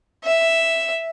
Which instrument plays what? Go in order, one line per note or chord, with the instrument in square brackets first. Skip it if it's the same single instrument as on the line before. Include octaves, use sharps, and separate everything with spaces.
[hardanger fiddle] E5